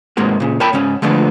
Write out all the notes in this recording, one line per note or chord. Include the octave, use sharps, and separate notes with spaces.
G#2 C3 G#3 A#3 F#4
A#2 C#3
A#4 C#5 G5 A5 B5
G#2 C#3 C#4
D3 F3 G#3 A3 B3 D4